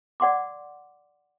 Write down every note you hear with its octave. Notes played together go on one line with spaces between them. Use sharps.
D5 F#5 C6 D6